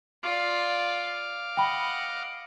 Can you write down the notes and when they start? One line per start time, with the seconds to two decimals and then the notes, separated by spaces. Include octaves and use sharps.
0.23 F4 D5 F5 D6
1.57 D#5 F#5 G5 B5